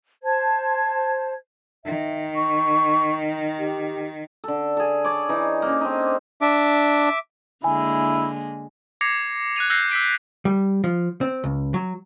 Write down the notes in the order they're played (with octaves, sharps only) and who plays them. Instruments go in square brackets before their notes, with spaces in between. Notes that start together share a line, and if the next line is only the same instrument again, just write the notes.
[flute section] C5 A5 G#6
[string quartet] D#3 [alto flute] E5
[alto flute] C#6
G4
[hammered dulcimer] D3 A4
G#4 A4
C#5 D5
E3 D#4
A#3 C#4
C4 D4 D#4
[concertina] D4 [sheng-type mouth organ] E5 D6
[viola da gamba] D3 G#3 A#3 [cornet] E4 [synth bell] G#5
[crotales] D6 G#6 A#6 C7 C#7 F7
F#6 G#6 D#7 F7
E6 F#6 G6 A#6 C7 C#7
E6 G6 B6 D7
[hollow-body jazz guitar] G3
F3
C4
C#2
F#3